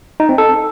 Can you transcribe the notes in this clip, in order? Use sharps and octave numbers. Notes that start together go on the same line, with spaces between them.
D#4
C4
A4